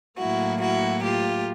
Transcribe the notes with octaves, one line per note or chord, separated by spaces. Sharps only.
A2 F#3 A#3 E4 F#4
E4 F#4
F4 G4